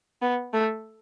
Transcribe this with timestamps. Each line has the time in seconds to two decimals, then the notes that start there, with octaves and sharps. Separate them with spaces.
0.22 B3
0.53 A3